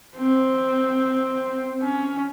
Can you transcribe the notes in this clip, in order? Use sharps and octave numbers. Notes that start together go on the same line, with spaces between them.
C4
C#4